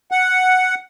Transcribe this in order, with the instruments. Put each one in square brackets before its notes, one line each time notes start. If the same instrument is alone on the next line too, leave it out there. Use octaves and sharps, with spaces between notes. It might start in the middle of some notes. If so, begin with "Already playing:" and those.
[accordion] F#5